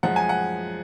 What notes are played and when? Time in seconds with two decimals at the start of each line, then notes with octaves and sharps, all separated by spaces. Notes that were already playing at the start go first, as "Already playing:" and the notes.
0.03 F#2 F3 G#3 F#5
0.16 G#5
0.29 F#5